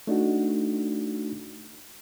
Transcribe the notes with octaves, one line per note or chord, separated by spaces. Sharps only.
A3 D4 D#4 F#4